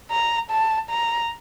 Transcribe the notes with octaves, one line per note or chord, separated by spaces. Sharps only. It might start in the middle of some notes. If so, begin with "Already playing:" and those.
A#5
A5
A#5